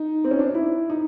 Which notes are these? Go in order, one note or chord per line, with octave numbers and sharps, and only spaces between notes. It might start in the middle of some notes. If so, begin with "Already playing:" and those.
Already playing: D#4
C4
C#4
D4
D#4
E4
D#4